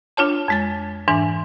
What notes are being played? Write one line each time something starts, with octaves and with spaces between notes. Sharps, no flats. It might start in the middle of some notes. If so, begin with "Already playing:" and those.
D4 F4 C#5 A5
F2 G#3 A6
G#2 E3 D4 G#5